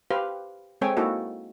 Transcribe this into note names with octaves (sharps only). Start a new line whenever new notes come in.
G4 B4 C5 F5
G#3 C4 A4 C#5 G5 G#5
A#3 D#4 E4 F#4 A4